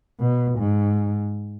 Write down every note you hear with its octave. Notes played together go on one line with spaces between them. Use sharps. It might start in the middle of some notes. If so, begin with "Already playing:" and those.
B2
G#2